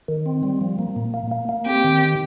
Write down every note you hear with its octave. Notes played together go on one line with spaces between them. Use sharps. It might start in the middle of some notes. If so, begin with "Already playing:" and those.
D#3
C4
G3
F3
A#3
A#2
A#3
A#3
A#3
C4 G4
D#3